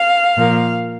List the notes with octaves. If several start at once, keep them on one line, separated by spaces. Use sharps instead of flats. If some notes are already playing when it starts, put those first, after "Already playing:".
Already playing: F5
A#2 F3 A#3